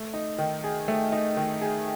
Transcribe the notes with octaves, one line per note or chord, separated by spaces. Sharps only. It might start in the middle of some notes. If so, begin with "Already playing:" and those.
Already playing: A3
D#4
D#3
G#4
A3
D#4
D#3
G#4